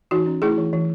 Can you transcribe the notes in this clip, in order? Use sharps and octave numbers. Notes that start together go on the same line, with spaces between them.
E3 D#4 F#4
C#4
A3 E4 G#4
E3
E3